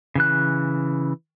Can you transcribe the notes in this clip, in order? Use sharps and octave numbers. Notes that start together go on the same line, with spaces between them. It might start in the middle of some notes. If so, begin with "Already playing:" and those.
C#3 E3 F#6